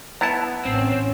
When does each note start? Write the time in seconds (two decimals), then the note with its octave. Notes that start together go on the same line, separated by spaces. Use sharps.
0.21 B3 E4 A5 A#5
0.65 A1 C4 C#4